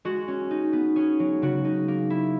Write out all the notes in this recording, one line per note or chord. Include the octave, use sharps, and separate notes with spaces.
G#3 F#4
C#4
D#4
B3
C#4 G#4
F#3
C#3 F#4
D#4
A#3
E4